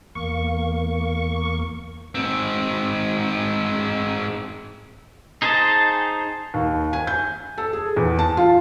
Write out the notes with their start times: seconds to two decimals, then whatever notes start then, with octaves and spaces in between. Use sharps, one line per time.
0.15 E2 A#3 C#6
2.15 G#2 C4
5.42 D#4 G#4 C5 D#5 A5
6.54 D#2
6.93 G#5
7.07 G6
7.58 A4
7.73 G#4
7.96 E2
8.19 A5
8.37 F4